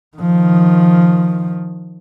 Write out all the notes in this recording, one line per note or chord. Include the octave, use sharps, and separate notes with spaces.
D#3 F3